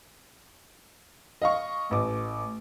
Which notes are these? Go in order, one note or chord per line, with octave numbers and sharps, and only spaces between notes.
D#5 F5 C#6
A1 A3 D6